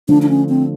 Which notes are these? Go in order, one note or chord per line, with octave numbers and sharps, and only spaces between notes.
D3 F3 A3 D4
D4
C#4
C4